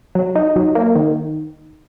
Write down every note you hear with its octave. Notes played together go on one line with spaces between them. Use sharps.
F#3
D#4
F#3
A#3
D#3